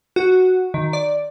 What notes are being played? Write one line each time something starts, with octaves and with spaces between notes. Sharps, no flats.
F#4
D#3
D5